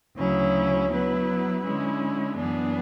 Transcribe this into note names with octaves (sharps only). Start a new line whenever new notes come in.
D2 C#3 F#3 C#4 E4
F#3 B3 E4 B4
D3 G#3 C#4 E4
F#2 E3 B3 D4 G#4